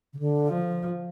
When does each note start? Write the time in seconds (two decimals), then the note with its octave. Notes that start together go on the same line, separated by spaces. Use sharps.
0.13 C#3
0.19 D3
0.47 F3